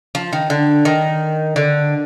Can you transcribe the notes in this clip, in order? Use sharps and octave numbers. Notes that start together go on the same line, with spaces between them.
F3
D#3
D3
D#3
D3